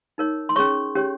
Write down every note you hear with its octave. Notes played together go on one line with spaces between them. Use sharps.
D#4 A#4 C#5
C6
C#4 G#4 C#5 C#6
C#4 G4 C#5